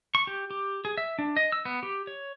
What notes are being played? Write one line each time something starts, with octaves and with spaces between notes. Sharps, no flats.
C#6
G4
G4
G#4
E5
D4
D#5
E6
B3
G4
C#5